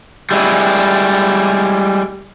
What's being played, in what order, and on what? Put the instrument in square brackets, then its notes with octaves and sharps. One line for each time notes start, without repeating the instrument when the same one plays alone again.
[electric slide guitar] G3 G#3 E4